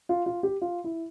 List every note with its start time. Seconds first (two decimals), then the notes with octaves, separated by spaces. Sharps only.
0.09 F4
0.26 F4
0.43 G4
0.62 F4
0.84 E4